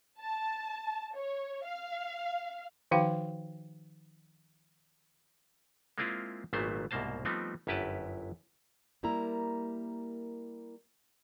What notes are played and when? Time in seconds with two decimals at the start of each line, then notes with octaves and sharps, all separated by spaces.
0.20 A5
1.16 C#5
1.64 F5
2.91 D#3 F3 D#4 F#4 F5 G5
5.98 G#3 A#3 C4 E4 F4 G#4
6.53 G#1 A#2 F#3 A3 B3 C5
6.91 C2 G#2 B2 A#3 C5 A5
7.25 F3 G3 A3 B3 C4 D#4
7.67 G1 F#2 E4 G4 B4 A5
9.03 G3 A#3 E4 A#4 A#5